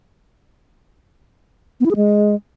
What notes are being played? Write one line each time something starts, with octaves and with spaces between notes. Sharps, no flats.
B3
E4
G#4
G#3